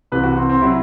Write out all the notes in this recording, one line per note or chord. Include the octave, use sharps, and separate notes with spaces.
C2 C3 E3 B4
F#4
C4
C4
C3 F#3 E4